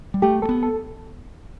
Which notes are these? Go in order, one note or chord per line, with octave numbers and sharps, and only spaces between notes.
G3
A3 G4
A3 A4
B3
A4